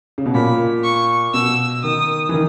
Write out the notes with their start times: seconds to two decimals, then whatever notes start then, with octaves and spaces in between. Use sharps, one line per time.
0.18 C#3
0.26 B2
0.35 A#2 B5
0.84 C#6
1.34 B2 E6
1.84 D#3 D#6
2.29 E3
2.34 D#3